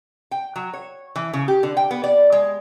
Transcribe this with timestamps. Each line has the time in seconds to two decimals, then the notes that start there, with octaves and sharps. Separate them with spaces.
0.31 G5
0.56 F#3
0.73 C#5
1.16 E3
1.33 C#3
1.48 G4
1.63 D3
1.77 G5
1.91 B3
2.04 D5
2.32 G#3